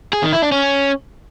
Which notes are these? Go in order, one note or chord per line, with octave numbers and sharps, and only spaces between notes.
G#4
D#3
E4
D4
C#4